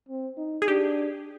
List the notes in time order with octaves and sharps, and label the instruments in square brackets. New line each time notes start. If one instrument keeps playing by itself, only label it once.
[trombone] C4
D#4
[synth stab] G#4
[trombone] D4 [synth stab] G4